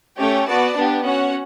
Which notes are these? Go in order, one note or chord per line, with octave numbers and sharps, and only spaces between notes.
A3 C#4 G4 C#5 G5
B3 F#4 B4 D5 A5
B3 D4 G4
C#4 F#4 C#5 F#5